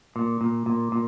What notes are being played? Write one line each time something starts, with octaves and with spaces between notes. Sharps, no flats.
A#2
A#2
A#2
A#2